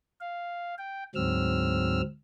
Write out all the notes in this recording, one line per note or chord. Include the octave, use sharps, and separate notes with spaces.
F5
G5
D2 G#2 F#3 C4 E6 F6